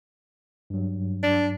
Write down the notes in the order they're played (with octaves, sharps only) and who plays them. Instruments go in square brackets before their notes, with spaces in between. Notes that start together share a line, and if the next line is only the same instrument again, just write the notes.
[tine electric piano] G2 F#3
[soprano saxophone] D4